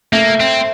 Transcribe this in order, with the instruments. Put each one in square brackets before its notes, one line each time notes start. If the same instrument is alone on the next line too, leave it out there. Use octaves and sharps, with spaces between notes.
[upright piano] A3 [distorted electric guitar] A#3
[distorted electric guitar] C4